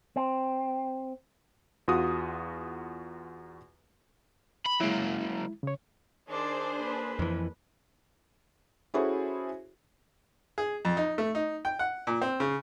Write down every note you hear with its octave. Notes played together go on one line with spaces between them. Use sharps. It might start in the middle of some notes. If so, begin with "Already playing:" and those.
C4
E2 F4 F#4 D#6
B5
F#3 G#3 A#3 E4
C#3 C#5
D#3 D4 G#4 C5 D5
A#3 B4
F2 E3
C#4 E4 F#4 G#4 A4 C5
G#4
F2
D#4
A3
D#4
G5
F#5
A#2
C4
C#3